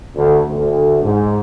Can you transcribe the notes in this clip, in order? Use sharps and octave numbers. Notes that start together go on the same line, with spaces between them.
D2
D2
G#2